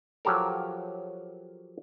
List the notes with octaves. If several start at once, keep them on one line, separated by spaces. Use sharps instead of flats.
F3 F#3 G4 A4 A#4